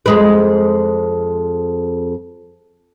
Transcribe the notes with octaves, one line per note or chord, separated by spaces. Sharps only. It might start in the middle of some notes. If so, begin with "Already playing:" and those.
F2 G#3 B4